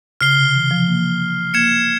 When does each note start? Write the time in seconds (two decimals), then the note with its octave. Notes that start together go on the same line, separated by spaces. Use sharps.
0.21 C#3 F6 C7 G7
0.38 C3
0.54 E3
0.71 F3
0.88 A#3
1.54 A#3 G#6 C#7 E7